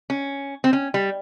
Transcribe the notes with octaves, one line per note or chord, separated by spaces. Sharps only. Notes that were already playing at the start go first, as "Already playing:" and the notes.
C#4
C4
C#4
G3